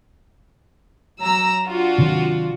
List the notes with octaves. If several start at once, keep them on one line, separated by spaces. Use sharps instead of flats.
F#3 A#5 E6
D4 F4 F#4
C3 D#3 F#3